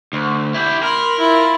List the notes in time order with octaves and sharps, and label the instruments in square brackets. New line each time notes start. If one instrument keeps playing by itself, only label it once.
[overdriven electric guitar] D2
E4 G4
[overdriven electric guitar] A#4 [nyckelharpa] B5 C6
[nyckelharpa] E4 F4